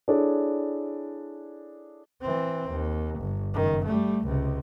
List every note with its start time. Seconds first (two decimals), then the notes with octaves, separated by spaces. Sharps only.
0.08 D4 E4 G#4 A4 C#5 D5
2.22 E3 C4
2.71 D#2
3.20 G1
3.54 F#1 D#3
3.85 G3 A3
4.25 C#2 C3